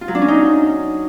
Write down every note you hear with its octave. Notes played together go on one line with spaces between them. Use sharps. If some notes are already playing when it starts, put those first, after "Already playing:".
F4
F#3
D4
C#4
D#4